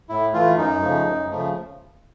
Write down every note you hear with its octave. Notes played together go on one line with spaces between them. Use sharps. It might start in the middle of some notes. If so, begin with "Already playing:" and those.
A2 E4
E3 A3 F4
F#2 D#4
C#3 F3 A3
F#2
C#3 F3 A3